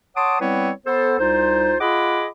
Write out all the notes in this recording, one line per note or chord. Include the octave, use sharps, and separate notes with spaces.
C#5 F#5 A5 C6 D6 D#6
G3 B3 C4 E4 B4 C#5
B3 A4 C5
C2 D#4 F4 C5
F4 G#4 D#5 F#5 B5 D6